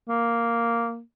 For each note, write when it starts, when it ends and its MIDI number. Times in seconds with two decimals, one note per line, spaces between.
0.09 1.01 58